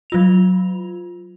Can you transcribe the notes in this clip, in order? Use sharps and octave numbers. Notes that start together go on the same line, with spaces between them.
F#3 F4 F7